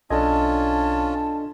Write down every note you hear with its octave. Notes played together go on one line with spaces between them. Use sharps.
B1 C#4 D4 F4 A4 D#5 A5 G#6